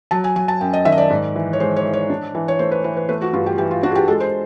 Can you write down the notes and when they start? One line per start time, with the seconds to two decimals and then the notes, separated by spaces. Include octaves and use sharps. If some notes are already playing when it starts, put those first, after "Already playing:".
0.11 F#3 A5
0.24 G#5
0.36 F#3 G#5
0.48 A5
0.61 F#2 G5
0.73 D#5
0.85 D#3 E5
0.92 D#5
0.98 D5
1.10 G#2
1.36 E3
1.53 C#5
1.60 G#3 C5
1.76 C#5
1.85 E3
1.93 C#5
2.10 D4
2.35 E3
2.48 C#5
2.59 A3 C5
2.72 B4
2.84 E3 B4
2.97 B4
3.09 A3 B4
3.22 F#4
3.33 G2 F4
3.46 G4
3.58 E3 G4
3.71 F4
3.83 D4 F#4
3.91 G#4
3.95 G4
4.08 G#3 A4
4.20 C5